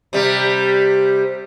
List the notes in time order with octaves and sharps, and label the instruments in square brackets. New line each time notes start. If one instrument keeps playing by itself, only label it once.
[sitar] C3 G3